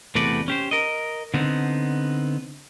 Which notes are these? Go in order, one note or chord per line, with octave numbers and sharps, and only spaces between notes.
E2 C3 A3 F#4 B4 D5
C#4 G4 C5
A#4 D#5
D3 B3 C4 D#4